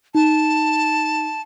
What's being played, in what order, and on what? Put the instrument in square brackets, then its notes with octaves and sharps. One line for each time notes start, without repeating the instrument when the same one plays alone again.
[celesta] D#4 [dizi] A5